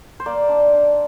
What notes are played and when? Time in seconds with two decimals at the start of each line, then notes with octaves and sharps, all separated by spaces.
0.20 C5
0.26 A#3 D5
0.49 D4
0.73 D4